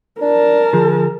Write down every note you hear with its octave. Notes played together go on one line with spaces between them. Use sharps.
D4 A#4 A5
D3 F3 G#4